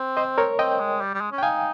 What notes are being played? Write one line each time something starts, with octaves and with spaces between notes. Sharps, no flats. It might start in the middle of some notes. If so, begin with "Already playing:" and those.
Already playing: C4
C5 D#5
A#4 C#5
C4 D#5 G5
G#3
G3
G3
G#3
C#4
G5
D#4 F5 G#5